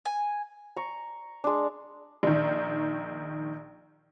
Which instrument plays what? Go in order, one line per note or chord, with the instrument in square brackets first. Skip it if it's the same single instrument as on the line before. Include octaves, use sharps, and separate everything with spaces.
[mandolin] G#5
[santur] A#5 C#6
G#3 D4
[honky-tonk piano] A#1 D#3